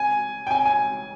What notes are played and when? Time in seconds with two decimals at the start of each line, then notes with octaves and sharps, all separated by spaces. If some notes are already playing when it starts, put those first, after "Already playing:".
Already playing: G#5
0.47 G5
0.51 G#5
0.66 G#5